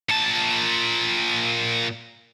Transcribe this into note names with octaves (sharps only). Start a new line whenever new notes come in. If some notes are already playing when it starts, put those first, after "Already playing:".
A#2 A5